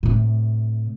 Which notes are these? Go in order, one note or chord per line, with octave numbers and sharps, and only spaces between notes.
A2 C3